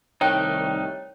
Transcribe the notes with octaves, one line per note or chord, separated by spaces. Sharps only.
C2 D#3 G3 A3 D#4 C#5 G5 F#6